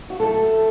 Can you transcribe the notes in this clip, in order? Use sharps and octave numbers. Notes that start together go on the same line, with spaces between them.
F#4
A2 F#3 A3 A4